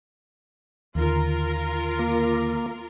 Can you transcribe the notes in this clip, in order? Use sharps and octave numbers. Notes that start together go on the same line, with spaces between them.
D#2 D3 D#3 F4 A#4
A#3